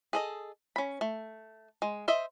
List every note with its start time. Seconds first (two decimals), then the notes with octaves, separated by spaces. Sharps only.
0.13 G#4 A4 D#5
0.76 C#4 B5
1.01 A3
1.82 G#3
2.08 C5 D#5 E5